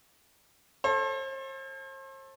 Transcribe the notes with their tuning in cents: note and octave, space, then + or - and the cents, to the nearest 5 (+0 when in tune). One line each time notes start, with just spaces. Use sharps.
A4 +0 C5 +40